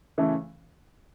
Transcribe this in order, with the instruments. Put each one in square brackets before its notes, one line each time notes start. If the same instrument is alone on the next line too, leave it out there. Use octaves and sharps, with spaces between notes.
[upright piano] C#3 E3 A3